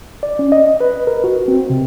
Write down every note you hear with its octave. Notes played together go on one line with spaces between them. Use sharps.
D5
C#4
D#5
B4
A#4
F#4
C4
C3